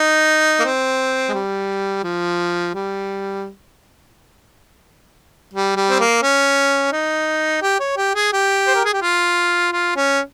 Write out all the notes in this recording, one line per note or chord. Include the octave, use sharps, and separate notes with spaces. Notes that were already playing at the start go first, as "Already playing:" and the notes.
Already playing: D#4
A#3
C4
G#3
G3
F3
G3
G3
G3
C4
A#3
C#4
D#4
G4
C#5
G4
G#4
G4
C5
A#4
G#4
G4
F4
F4
C#4